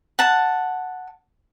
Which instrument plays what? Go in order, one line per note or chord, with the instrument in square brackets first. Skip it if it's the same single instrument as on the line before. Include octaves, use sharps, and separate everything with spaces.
[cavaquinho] F#5 A5